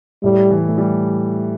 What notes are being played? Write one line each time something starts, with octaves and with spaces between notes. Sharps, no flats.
A2 G3
E3
A3
G3